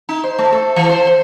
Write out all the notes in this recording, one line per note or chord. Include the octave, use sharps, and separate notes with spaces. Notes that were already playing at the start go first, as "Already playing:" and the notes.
D#4
C5
A3
A4
E3
C5
C5